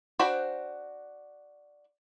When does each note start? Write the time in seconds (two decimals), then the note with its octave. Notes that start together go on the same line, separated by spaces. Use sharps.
0.19 D4 F#4 C5 G5 B5